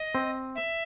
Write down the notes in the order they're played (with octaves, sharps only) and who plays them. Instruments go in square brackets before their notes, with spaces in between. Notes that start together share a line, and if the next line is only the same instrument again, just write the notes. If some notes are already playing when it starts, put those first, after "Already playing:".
Already playing: [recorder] D#5
[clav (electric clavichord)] C4
[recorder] E5